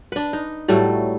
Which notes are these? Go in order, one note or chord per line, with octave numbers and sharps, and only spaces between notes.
D4 B4
D#4
A2 F#3 G3 A3